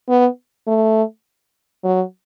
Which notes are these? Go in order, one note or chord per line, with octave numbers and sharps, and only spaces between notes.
B3
A3
F#3